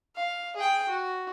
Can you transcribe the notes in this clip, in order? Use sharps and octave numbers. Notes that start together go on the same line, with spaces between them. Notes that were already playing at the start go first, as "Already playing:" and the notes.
F5
G#4 G5
F#4